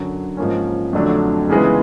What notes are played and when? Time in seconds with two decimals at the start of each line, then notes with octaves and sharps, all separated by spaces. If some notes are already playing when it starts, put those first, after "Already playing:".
Already playing: F#2 D3 F#3
0.37 G#2 F3 A#3 C#4
0.93 F2 D3 F#3 A3 D4
1.49 C#2 C#3 E3 G#3 B3